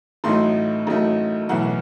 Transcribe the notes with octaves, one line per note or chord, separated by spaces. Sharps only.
A1 A2 F#3 A3 D#4 C6
A1 A2 F#3 A3 D#4
B1 A2 E3 F#5